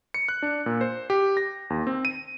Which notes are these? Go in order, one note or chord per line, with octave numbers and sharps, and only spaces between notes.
C#7
F#6
D4
A#2
C5
G4
A#6
D#2
C4
D#7